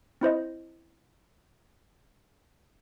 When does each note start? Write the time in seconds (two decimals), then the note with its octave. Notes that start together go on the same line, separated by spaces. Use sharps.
0.21 C4 E4 C5 D#5